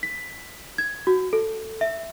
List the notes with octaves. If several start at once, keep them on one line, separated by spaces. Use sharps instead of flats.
B6
G#6
F#4
A4
E5